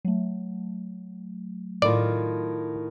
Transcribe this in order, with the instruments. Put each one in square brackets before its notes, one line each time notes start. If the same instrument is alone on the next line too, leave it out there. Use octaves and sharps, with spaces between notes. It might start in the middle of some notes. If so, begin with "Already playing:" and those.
[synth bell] F#3 A3
[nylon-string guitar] A2 D#3 F4 [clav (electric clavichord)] D5